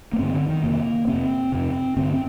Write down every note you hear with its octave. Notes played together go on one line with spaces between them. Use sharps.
A#3
G2 D3 C4
D3
D#3
F2 C3 A#3
F2 C3 C4
F2 C3
G2 D3 C4
C4